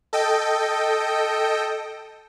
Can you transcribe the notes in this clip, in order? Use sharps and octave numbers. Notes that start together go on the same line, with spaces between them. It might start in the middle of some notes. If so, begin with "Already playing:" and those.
A4 D#5 G5